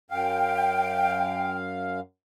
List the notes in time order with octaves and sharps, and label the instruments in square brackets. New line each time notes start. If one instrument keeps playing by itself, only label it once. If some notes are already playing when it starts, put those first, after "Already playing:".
[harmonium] F#2 F5 [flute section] G5